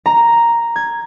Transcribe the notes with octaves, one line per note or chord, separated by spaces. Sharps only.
A#5
G#6